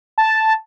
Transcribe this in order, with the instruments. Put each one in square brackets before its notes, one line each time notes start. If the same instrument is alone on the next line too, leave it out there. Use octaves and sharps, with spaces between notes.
[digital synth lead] A5